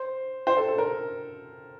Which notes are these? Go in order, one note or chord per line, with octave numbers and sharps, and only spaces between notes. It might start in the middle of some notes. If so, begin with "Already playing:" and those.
Already playing: C5
C5
A4
A4
A#4